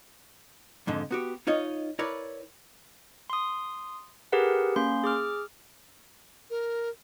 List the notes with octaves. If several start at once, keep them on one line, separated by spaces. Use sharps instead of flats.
F2 G#2 D3
B3 F#4 G4
D#4 F4 C#5 D#5
E4 A#4 B4 C#5 D5
C6 D#6
G4 G#4 A#4 B4 F#5
A#3 C#4 C6
G#4 D6 F6
A#4